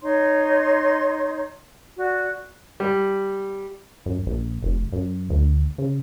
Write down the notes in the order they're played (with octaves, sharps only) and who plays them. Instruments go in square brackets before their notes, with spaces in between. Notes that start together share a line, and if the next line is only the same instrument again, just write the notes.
[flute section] D#4 C#5 C6
F#4 D5
[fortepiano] G3
[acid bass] F#2
A#1
F1
F#2
D2
C#3